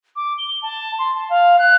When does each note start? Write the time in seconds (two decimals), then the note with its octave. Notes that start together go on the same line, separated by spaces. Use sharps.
0.16 D6
0.38 G7
0.62 A5
0.99 C6
1.15 A5
1.29 F5
1.58 F#6